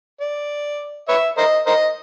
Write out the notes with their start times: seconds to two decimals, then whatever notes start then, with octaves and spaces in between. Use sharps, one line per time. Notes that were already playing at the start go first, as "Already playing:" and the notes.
0.21 D5
1.09 B4 C#5 E5
1.38 A#4 C5 D#5
1.67 A#4 C5 D#5